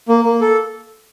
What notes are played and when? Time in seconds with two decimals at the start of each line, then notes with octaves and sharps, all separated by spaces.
0.08 A#3
0.25 A#3
0.41 A4